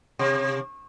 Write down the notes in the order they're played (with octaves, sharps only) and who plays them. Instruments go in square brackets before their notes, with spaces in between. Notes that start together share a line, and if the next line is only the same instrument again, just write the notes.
[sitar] C3